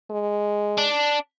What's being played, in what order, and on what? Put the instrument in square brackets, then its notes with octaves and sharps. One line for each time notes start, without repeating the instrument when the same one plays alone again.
[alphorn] G#3
[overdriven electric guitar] D4